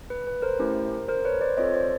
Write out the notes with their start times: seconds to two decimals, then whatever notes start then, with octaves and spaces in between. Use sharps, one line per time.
0.10 B4
0.27 B4
0.42 A#4 C5
0.59 A3 C#4 E4 G4
1.08 A#4 C5
1.25 B4 C#5
1.41 C5 D5
1.57 C4 F4 A4 C#5 D#5
1.74 C5 D5